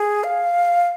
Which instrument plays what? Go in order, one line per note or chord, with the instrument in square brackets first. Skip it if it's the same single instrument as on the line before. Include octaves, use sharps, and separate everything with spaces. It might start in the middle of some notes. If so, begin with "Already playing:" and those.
Already playing: [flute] G#4
F5